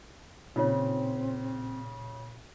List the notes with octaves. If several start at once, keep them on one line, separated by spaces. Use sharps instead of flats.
A#2 C#3 C4 D#4 F4 C#5